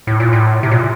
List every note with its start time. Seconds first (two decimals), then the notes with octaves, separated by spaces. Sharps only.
0.07 A2
0.20 A#2
0.33 A2
0.63 C3
0.71 A#2